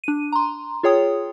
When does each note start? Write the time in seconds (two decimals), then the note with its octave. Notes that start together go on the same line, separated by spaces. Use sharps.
0.04 D4 D#7
0.32 A#5 C6
0.83 F4 G#4 C#5 G5 D#6